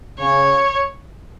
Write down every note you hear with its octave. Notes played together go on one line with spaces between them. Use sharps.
C#3 C#5